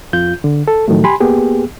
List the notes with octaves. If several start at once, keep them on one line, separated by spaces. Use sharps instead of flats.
F2 F4 G6
D3
A4
A2 D#3 F3 F#3 A3
G4 G#5 B5 C6
A#3 B3 G4 G#4